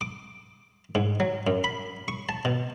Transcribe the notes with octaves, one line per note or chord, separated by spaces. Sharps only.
D6
G#2
F#3
F#2
B5
C#6
A5
B2